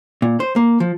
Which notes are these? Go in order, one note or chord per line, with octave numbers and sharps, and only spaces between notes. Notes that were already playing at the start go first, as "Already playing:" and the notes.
A#2
C5
A#3
F3